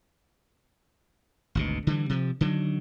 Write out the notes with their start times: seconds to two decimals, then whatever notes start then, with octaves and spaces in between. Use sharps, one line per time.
1.55 G#1 D2 B2
1.87 D3 E3 G3
2.09 C3 F3
2.41 D3 D#3 F#3